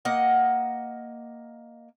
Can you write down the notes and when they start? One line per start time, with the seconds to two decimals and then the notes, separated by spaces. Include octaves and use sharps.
0.05 A#3 D#5 F#5